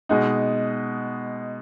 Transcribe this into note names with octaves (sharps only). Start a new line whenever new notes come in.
B2 G#3 D#4